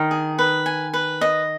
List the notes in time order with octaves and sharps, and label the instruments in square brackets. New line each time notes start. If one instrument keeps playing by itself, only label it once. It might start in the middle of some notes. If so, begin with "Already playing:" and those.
Already playing: [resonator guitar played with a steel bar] D#3 [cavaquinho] D#5
[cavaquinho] G#4
B4
G#5
B4
D#5